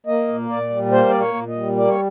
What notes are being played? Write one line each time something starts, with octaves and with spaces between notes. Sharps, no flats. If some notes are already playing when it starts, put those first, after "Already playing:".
A#3 D#5
A#2
A#2 D5
G3
A#3 C5
A#2 D5
C#5
A#2
D#5
G3
A#3 D5
C#5